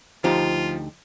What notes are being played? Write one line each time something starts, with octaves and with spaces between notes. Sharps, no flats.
D2 F3 D#4 F4 G4